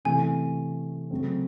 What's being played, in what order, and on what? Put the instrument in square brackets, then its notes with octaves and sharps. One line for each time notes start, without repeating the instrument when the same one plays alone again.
[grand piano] C3 E3 A3 C#4 [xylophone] G#5
[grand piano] C#3 F#3 A3 C4